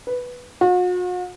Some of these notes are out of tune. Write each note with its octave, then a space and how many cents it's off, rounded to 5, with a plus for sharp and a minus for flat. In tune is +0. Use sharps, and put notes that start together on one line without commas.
B4 +0
F#4 -45